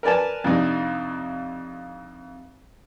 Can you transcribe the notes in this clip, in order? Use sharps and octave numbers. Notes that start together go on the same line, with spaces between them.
A#4 B4 D5 G#5 A5
F2 C3 D4 D#4